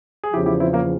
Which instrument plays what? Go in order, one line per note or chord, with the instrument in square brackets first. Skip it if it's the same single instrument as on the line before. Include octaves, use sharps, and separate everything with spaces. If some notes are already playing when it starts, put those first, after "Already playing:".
[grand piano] G#4
[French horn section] E2 C#3 F3 [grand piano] E4 G4
[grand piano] E4 G4
C4 E4
A#3 C#4